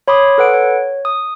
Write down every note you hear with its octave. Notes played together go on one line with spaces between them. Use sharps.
C#5 B5 C6 D6 D#6
A4 B4 F#5 D7
C#5
D#6